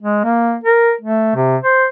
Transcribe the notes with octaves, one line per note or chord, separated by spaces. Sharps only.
G#3
A#3
A#4
A3
C3
C5